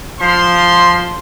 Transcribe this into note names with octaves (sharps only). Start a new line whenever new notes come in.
F3 C6